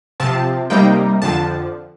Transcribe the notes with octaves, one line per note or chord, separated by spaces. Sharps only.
C3 F3 C4 A5
C3 G3 A#3 D#4 G5
F2 D3 F3 A5